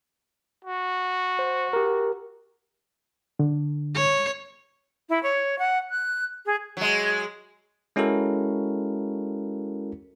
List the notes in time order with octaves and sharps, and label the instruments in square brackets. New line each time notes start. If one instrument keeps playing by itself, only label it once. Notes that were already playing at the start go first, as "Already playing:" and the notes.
[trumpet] F#4
[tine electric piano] C5
G4 A#4
[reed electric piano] D3
[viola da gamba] C#5
[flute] E4
C#5
F#5
F#6
G#4
[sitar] F#3 G#3
[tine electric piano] G#3 C#4 E4 F#4 A4 A#4